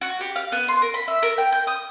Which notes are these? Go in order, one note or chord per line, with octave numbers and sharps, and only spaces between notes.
F#4
G4
F5
B3
C6
A#4
B5
E5
A#4
G5
G6
D#6